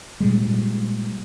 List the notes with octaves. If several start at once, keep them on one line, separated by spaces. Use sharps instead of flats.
A#2 G3 G#3